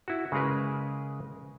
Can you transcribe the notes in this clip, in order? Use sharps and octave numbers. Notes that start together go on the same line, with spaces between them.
E4 F#4
C#3 G#3 G#4 A#4 B4